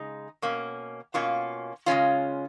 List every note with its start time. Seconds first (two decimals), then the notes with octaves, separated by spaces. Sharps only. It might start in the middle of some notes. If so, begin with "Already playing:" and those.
Already playing: C#3 G#3 D#4
0.42 B2 A#3 C#4
1.14 B2 A#3 C#4 F4
1.86 C#3 G#3 C#4 F4